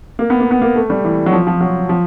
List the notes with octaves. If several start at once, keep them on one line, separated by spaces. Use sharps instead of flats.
A#3
B3
A#3
B3
A#3
A3
G3
E3
F#3
F3
F3
F#3
F3